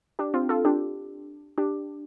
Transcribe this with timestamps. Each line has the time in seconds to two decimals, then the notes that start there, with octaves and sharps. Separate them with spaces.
0.19 D4 G4
0.34 C4 F4
0.49 F4 A4
0.65 D4 G4
1.58 D4 G4